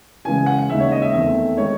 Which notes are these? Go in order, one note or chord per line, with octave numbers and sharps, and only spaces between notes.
C#3 E3 G#3 G#5
F#5
F#5
D#2 C#3 G#3 D#4 E5
C#5
D#5
E5
E2 D#3 A3 C4 E5
D#3 G#3 D#4 C#5